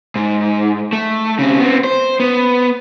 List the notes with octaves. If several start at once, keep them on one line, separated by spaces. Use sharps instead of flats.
G#2
A3
C#3 C4
B3 C4
C5
B3